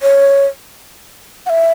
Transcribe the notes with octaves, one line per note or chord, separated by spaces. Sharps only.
C#5
F#5
E5